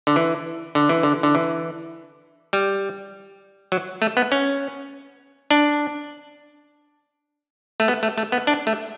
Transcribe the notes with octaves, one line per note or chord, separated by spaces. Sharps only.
D3
E3
D3
E3
D3
D3
E3
G3
F#3
A3
B3
C#4
D4
A3
B3
A3
A3
B3
D4
A3